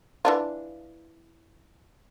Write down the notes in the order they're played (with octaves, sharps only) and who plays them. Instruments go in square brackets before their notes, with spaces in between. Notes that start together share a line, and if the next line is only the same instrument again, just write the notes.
[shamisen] E3 D4 F4